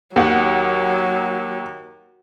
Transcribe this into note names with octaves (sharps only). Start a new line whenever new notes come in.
D#2 F#3 F#5